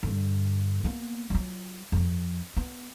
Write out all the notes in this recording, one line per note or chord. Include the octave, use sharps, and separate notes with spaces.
G2 D3
A#3 B3
F#3 F4
F2 F3
B3